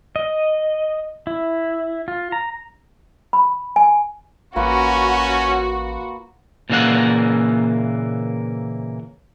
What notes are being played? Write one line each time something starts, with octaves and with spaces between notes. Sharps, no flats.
D#5
E4
F4
A#5
B5
G#5
A1 A#3 C#4 F4 F#4 B4
A#2 C#3 E3 A#3 F5 F#5